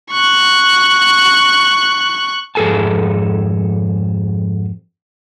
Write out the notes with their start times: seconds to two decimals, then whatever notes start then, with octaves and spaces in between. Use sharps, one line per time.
0.11 C#6 F#6
2.55 F2 G#2 G#4 A4 G#5 A5